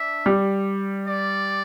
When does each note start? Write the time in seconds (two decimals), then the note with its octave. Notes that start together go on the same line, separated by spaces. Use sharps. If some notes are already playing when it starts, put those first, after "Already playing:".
Already playing: D4 E5
0.26 G3
1.08 D5